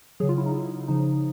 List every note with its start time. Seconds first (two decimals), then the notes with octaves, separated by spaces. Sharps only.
0.20 C#3 F#3 G#4
0.29 F4
0.38 E4
0.46 D#4
0.88 C#3 F3 D#4